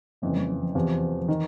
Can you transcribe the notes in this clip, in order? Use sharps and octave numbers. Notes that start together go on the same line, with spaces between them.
F#1 F2 C#3 E3 F3
G3
F#3
F3
E2 C3 E3 F3
F3
D#3 E3